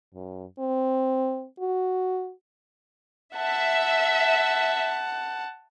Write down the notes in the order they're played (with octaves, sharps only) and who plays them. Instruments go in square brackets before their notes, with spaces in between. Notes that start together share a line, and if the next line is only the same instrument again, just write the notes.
[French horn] F#2
C4
F#4
[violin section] E5 [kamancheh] F#5 A5